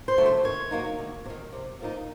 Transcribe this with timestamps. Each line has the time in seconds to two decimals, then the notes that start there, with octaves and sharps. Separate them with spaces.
0.08 C5
0.18 D3 F#3 A3
0.26 C5
0.44 D#3 C#5
0.71 F#3 A#3 D#4
0.99 D2
1.25 C3
1.30 D#3
1.52 C3
1.80 F3 A#3 D#4